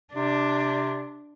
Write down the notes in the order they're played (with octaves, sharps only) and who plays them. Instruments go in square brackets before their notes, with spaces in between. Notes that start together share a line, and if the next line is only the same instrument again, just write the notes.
[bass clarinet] C3 [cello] D4